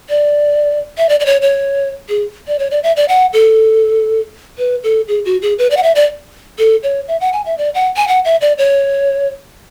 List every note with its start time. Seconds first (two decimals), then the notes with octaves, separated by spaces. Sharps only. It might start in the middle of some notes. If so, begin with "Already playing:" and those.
0.09 D5
0.98 E5
1.09 D5
1.20 D5
1.26 C#5
1.42 C#5
2.09 G#4
2.48 D5
2.59 C#5
2.71 D5
2.83 E5
2.96 D5
3.09 F#5
3.33 A4
4.58 B4
4.83 A4
5.08 G#4
5.25 F#4
5.42 G#4
5.58 B4
5.71 D5
5.77 F#5
5.83 E5
5.95 D5
6.59 A4
6.83 C#5
7.08 E5
7.21 F#5
7.33 G#5
7.46 E5
7.58 D5
7.75 F#5
7.96 G#5
8.08 F#5
8.25 E5
8.41 D5
8.58 C#5